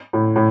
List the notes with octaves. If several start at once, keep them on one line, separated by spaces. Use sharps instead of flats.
A2
A2